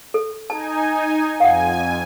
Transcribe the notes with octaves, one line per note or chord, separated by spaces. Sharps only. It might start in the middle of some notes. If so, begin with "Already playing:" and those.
A4
D#4 G#5 A5
F2 F5 F#5 G#5